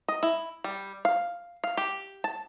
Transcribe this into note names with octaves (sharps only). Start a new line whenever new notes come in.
D#5
E4
G3
F5
F5
G4
A5